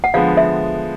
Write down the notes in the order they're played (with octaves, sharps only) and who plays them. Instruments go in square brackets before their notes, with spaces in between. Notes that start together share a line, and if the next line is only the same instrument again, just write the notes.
[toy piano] F#5
[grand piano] D3 F3 G#3 B3 [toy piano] F5
[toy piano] E5